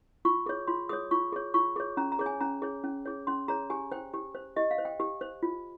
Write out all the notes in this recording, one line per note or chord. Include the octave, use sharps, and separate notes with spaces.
F4 C#6
G#4 C#5
F4 C6
G#4 C#5 D#6
F4 C#6
G#4 C#5
F4 C#6
G#4 C#5
C#4 A#5
A#5
G#4 C#5
G#5
C#4 A#5
G#4 C#5
C#4
G#4 C#5
C#4 C6
G#4 C#5 A#5
G4 G#5
C5 G5
G4
C5
G4 D#5
F5
C5
G5
G4
C5
F4